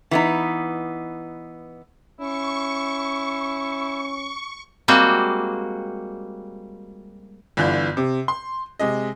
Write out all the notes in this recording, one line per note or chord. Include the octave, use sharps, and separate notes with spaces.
E3 B3 D#4
C#4 E4 C#6
G3 G#3 A#3 C4 F#4
G1 D3 E3 F4 G6
C3
C6
C3 G#3 D#5